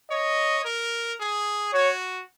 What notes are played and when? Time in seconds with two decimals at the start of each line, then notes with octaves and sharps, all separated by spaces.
0.11 C#5 D#5
0.65 A#4
1.20 G#4
1.73 F#4 C#5